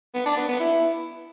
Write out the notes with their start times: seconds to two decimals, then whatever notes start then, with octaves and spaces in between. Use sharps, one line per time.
0.15 B3
0.26 D4
0.37 B3
0.49 B3
0.60 E4